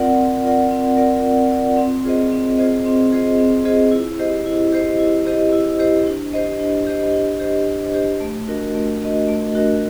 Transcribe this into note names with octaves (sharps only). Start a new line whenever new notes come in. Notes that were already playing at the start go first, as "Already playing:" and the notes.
Already playing: C4 F4 A#4 D5 F#5
C4
F4 A#4 D5 F#5
C4
F4 A#4 D5 F#5
C4
F4 A#4 D5 F#5
C4
F4 G#4 C5 D#5
C4
F4 G#4 C5 D#5
C4
F4 G#4 C5 D#5
C4
F4 G#4 C5 D#5
E4
G4 C5 D#5
E4
G4 C5 D#5
E4
G4 C5 D#5
E4
G4 C5 D#5
D4
G4 C5 D#5
D4
G4 C5 D#5
D4
G4 C5 D#5
D4
G4 C5 D#5
A3
D4 F#4 A#4 D#5
A3
D4 F#4 A#4 D#5
A3
D4 F#4 A#4 D#5